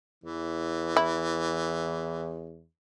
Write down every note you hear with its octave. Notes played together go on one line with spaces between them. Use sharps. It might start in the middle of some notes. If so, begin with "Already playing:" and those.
E2 E3
E4